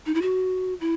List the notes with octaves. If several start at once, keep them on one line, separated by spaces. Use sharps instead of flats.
D#4
E4
F#4
E4